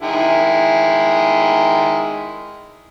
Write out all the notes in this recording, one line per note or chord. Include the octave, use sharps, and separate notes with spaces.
D#3 G#3 E4